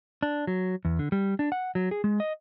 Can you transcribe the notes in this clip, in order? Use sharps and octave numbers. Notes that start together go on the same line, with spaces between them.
D4
F#3
E2
D3
G3
D4
F#5
F#3
G#4
G#3
D#5